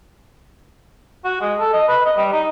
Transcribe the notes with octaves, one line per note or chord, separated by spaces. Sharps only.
F#4
G#3
A4
D#5
B4
D#5
G3
D#4